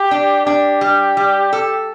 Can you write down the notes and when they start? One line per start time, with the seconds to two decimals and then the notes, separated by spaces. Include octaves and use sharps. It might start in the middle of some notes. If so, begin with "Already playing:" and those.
Already playing: G4
0.11 D4
0.46 D4 G4
0.81 G3
1.17 G3
1.53 A4